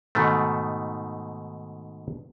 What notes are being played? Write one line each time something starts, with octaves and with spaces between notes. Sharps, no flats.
G#2 B2 D#3 A3